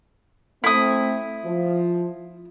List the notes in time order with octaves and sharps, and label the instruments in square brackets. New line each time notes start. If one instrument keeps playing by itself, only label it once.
[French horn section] A3 C4 [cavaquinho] E4 D#6
[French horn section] F3